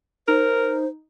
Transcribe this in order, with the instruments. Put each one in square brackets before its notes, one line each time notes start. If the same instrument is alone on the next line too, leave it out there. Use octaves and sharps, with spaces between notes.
[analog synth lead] D#4 [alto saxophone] A#4 [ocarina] C5